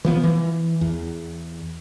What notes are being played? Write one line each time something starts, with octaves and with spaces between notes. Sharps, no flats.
E3 F3 B3
E3
E2